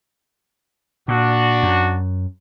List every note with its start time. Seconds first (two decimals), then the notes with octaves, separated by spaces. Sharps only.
1.08 A#2 D4 F#4
1.63 F#2